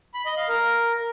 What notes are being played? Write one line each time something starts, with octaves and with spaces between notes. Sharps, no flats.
B5
D#5
F5
A#4